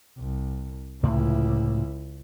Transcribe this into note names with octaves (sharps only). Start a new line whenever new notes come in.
C2
C#2 A2 C3 F3 E4